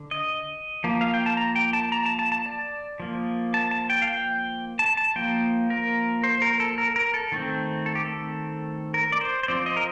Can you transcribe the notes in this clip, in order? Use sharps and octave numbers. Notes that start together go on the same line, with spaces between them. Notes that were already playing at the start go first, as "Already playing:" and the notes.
Already playing: D3
D#5
F3 A#3
F5
G5
A5
A#5
G5
A5
A#5
A5
A5
A5
D5
F3 A#3
A5
A5
G5
F5
G5
A5
A5
F3 A#3 G5
A#4
C5
A#4
A4
A#4
A#4
A4
D#3 A3 C4
A4
G4
A4
A#4
D5
C5
C5
F3 C4 D5
D#5
A#4